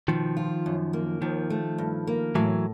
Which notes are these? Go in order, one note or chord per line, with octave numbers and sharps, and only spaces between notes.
B2 D#3 F3
F4
F#2
A#3
D#2 D#3 F3
A3
G2
A#3
A2 E3 F#3